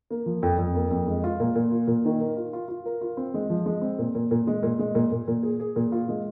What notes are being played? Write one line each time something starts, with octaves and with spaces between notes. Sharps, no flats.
A#3
F3
F2
F2
A#3
F2
G#3
F4
A#2
A#2
F4
A#2
D#3
A#4
F4
F4
F4
A#4
F4
C4
G#3
F3
G#3
C4
A#2
A#2
A#2
G#3
A#2
G#3
A#2
A#2
A#2
G#4
G#4
A#2
F4
G#3